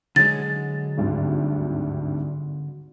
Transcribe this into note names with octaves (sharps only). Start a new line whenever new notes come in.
D3 F#3 G#3 A6
G#1 D2 G2